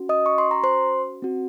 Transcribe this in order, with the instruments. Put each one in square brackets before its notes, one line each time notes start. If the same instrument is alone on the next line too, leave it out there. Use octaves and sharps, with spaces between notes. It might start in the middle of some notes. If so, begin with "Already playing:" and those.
Already playing: [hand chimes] C#4 F#4
D#5 D#6
C#6
C6
A#5
C5 C6
C4 F#4